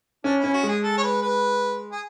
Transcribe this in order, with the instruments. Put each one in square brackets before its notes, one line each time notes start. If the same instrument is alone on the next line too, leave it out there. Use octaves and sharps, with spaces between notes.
[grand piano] C#4 [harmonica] D4
[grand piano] C#4 [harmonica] E4
[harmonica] F#4
[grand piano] G#3 [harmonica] G#4
[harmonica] A4
C#5
B4
B4
G#4